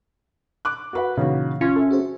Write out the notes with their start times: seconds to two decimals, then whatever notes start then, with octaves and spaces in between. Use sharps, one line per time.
0.65 D6 F#6
0.93 F#4 B4 F#5
1.17 A#2 C#3 E3 D#4 F#4
1.61 C#4 F4
1.76 A4 E5
1.91 F#4 G#4 C5